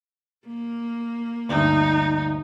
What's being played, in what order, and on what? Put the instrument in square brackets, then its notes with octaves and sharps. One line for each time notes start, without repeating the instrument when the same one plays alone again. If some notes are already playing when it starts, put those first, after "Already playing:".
[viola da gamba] A#3
[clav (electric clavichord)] D2 G2 E5 [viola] D#4